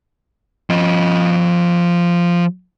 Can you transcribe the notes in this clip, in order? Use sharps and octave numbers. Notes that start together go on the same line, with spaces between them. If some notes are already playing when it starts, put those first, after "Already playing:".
F3 D#5